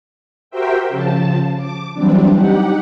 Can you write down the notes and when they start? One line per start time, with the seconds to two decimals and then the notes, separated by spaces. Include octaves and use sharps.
0.51 F#4 G4 A#4 C5 E5 G5
0.89 C#3 F3 A5
1.57 D6
1.94 E3 F#3 G3 C4 D4
2.35 D#4 G4 F#5